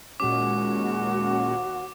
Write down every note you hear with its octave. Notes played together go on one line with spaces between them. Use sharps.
D#2 A#2 G#3 C#4 F#4 D6